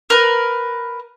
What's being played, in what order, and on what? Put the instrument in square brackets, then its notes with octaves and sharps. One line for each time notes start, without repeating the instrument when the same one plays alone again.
[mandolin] A#4 B4